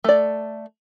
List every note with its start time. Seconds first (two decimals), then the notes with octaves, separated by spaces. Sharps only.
0.04 A3 D5